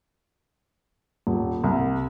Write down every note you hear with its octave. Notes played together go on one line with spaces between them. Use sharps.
D#1
C2